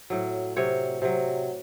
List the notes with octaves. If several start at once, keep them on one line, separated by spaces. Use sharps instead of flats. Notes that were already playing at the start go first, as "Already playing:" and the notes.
A2 F#3
C3 F#3 C#5
C3 F#3